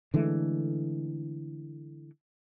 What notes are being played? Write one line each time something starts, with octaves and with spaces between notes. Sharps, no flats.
D3 E3 G#3 A3